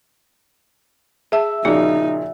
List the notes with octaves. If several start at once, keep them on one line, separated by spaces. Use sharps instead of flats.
G#4 E5 A5
A#2 C#3 F3 D#4 F#4